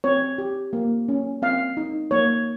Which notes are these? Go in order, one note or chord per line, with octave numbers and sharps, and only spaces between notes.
C4 C#5
G4
A#3
C#4
C4 F5
D#4
A#3 C#5